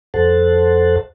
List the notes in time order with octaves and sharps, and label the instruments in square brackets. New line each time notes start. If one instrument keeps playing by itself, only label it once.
[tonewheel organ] F2 A4 C5 F#5 A5